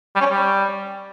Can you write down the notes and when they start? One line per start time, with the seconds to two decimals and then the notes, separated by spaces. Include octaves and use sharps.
0.15 G3
0.21 C#4
0.26 C#5
0.31 G3